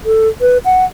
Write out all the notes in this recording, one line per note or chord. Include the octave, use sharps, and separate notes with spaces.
A4
B4
F#5